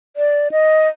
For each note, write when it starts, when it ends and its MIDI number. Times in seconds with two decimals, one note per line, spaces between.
0.17 0.48 74
0.52 0.88 75